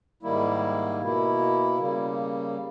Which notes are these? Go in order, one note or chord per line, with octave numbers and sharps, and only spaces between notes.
G#2 D#3 G3 A#3 E4
B2 A#3 E4
C#3 G3 A#3